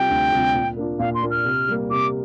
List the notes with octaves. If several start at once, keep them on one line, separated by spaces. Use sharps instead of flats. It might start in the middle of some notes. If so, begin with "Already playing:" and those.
Already playing: C3 G3 C4 F4 G5
D2
C3 G3 C4 F4
A#2
A#3 D4 F4
A#2 F5
C6
A#3 D4 F4
F6
C3
G3 A#3
C3 D6